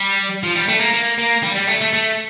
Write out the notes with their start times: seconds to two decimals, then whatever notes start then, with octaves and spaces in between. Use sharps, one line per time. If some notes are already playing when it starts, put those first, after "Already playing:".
Already playing: G3
0.43 F3
0.56 G3
0.68 A3
0.80 A#3
0.94 A#3
1.18 A#3
1.43 G3
1.56 G3
1.68 A3
1.81 A3
1.93 A3